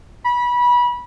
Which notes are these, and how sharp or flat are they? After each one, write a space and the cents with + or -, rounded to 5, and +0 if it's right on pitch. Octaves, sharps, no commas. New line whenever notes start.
B5 -25